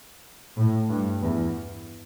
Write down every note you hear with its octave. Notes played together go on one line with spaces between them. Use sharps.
A2
G2
E2